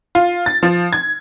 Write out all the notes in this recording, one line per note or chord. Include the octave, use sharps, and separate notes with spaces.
F4
A6
F3
G#6